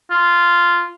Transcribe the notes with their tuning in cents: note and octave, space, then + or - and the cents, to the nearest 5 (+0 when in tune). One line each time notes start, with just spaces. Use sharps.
F4 -10